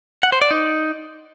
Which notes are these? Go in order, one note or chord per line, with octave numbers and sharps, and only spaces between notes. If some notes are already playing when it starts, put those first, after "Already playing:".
F#5
C5
D5
D#4